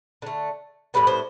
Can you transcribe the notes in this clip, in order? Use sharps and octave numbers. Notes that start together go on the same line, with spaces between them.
D3 A3
A2 G3 B3 B4
C5